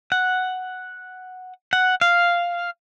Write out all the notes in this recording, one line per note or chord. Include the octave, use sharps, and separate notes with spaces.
F#5
F#5
F5